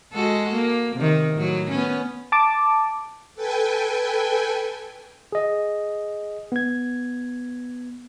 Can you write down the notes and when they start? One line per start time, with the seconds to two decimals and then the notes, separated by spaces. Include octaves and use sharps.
0.13 G#3 F#4 A4
0.55 A#3
0.97 C3 D#3
1.34 A2 F#3
1.70 B3 C#4
2.32 A5 D6
3.35 A4 B4 G5 G#5
5.32 G#4 D#5
6.52 B3 G#6